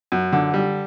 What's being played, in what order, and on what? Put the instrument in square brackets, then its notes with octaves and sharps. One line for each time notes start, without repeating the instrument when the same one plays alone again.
[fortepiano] F#2
D3
G3